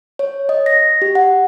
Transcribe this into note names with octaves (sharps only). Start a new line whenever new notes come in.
C#5
D#5
A#6
G4
F#5